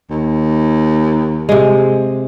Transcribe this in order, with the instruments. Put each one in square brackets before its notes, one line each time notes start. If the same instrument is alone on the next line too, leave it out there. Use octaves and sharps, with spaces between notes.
[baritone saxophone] D#2
[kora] C3 G#3